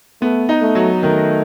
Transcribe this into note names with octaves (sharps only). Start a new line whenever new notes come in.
A3 B3
D#4
A3
F#3
D#3 A3